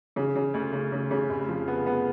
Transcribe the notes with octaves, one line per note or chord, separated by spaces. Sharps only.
C#3
C#3
D2
C#3
C#3
C#3
F1
F3
B3
B3